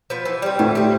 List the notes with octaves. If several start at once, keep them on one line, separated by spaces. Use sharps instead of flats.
F3 B3
E3
G3 C4
A2 E3
G3 C4